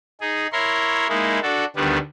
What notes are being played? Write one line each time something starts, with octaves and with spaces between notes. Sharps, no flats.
D#4 G#4
E4 A#4 C#5 C6
G#3 A#3 D#4 E4
D4 F#4 A4
D2 D#3 G3 B3 D4